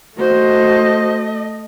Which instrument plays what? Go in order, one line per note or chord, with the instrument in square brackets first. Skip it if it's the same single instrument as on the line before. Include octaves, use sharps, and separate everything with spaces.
[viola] A3 D#5 [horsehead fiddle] F#4 C5